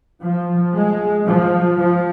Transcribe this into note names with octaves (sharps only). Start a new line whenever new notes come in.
F3
G#3
F3
F3